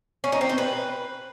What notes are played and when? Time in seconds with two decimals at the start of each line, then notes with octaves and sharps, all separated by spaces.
0.24 C#4
0.32 D#4
0.41 C4
0.49 C5
0.58 B4